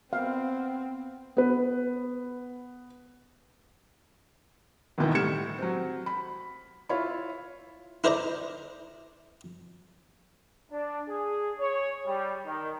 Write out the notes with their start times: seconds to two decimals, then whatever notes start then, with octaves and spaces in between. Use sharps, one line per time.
0.13 B3 C4 F5
1.37 B3 B4
4.98 G#1 D#2 B2 D#3 E3
5.15 A2 G3 F6 G#6 C#7 E7
5.58 F#3 C4
6.06 B5
6.89 E4 F4 C#5 B5
8.04 E4 A#4 C5 D5 D#5 A#5
10.72 D4
11.09 G#4
11.60 C#5
12.07 G3
12.45 D#3